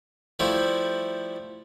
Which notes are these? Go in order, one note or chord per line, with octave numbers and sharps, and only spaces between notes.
F3 G3 A3 E4